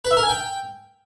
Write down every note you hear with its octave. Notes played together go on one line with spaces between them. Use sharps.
B4
E5
A#4
G#5
G5